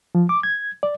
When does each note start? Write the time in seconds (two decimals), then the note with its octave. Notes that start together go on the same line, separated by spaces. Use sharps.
0.15 F3
0.29 D6
0.43 G#6
0.83 D5